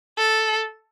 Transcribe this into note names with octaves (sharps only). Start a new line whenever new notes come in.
A4